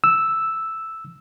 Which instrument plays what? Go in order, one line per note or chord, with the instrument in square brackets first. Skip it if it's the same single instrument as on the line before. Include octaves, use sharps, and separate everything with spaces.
[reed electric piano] E6